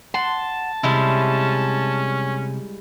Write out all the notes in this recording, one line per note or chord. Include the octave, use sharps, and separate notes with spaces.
F#5 A5 C6
C3 G3 G#3 C#4 E4